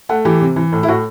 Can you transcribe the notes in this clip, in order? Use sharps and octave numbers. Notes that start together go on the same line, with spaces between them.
A3 F#5
E3 G4
C3
E3
A2
E4
A2 F#4